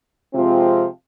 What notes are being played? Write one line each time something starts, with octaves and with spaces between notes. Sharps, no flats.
C3 F3 G#3 C4 F4